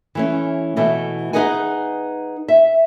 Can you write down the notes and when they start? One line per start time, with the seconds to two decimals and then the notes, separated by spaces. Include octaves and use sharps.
0.15 E3 A3 C#4
0.76 B2 E3 A3
1.33 D#4 G#4 B4 D#5 F#5 G#5
2.48 E5